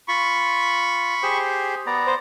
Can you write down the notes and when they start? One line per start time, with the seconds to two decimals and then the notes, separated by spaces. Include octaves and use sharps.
0.08 F4 B5 C#6
1.23 G4 G#4 C5
1.87 B3 D5 A#5
2.07 C5